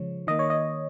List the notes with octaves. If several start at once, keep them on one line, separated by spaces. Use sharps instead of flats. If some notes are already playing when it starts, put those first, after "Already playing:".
Already playing: C#3 F3 G#3 C#5
D#3 A#3 D#5
C#5
D#5